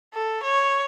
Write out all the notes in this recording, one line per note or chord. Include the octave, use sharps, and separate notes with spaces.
A4
C#5